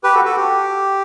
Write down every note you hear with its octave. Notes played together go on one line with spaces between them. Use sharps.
G4 B4
F#4 A4
F#4 A4
G4